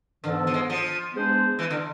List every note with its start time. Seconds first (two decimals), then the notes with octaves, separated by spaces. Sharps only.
0.24 G#2 D3 E3 B3 D4 A4
0.47 F3
0.54 G#3
0.70 F3
1.14 G#3 B3 D4 G#4 C5
1.59 E3
1.70 D3